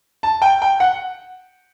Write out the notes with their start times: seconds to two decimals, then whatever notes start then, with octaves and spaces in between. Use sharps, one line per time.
0.23 A5
0.42 G5
0.62 G5
0.80 F#5